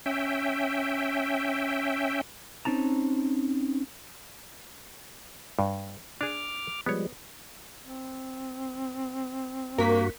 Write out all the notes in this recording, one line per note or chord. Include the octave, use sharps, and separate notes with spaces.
C#4 E5 G5
C4 C#4 D#4 A5 A#5
G2
D4 G#4 D6 F6
F3 G3 G#3 B3 C#5
C4
G2 A#3 F#4 A#4 B6